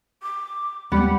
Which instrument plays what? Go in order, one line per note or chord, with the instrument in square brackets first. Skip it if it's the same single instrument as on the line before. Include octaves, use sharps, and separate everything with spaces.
[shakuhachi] D6
[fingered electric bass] D#2 G#3 C4 [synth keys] G3 G4 F#5 [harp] B3 [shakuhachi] B5